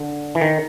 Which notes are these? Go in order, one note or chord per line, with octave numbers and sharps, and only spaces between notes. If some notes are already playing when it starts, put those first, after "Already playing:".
Already playing: D3
E3
D#3